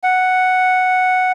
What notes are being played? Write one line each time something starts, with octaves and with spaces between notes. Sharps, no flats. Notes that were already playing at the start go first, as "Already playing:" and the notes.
F#5